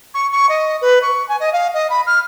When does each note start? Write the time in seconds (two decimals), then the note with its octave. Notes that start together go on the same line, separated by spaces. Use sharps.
0.14 C#6
0.32 C#6
0.49 D#5
0.81 B4
1.02 C#6
1.28 G#5
1.40 D#5
1.53 F5
1.74 D#5
1.90 B5
2.06 F6